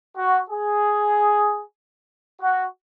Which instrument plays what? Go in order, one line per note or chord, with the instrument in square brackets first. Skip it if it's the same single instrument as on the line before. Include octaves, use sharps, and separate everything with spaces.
[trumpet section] F#4
G#4
F#4